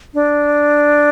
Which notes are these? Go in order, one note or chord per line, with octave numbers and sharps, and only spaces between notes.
D4